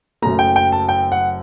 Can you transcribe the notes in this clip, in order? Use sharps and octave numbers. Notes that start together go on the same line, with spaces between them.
F#1 F#2 F#3 A3 A#5
G5
G5
A5
G5
F#5